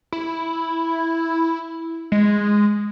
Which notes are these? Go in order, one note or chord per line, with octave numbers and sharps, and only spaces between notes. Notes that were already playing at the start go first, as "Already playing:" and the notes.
E4
G#3